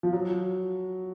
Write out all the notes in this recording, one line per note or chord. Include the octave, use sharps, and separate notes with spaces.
F3
F#3